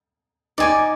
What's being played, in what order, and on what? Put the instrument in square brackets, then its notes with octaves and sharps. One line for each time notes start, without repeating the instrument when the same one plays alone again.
[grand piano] D#4 [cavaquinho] D5 G#5 D6